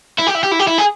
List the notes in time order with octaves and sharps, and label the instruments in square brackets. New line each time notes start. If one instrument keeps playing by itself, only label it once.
[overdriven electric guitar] E4
G4
E4
G4
E4
G4
E4
G#4